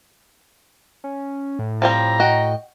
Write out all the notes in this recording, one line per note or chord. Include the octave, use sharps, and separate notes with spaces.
C#4
A2
F3 G3 C4 A#5
F#4 D#5 G5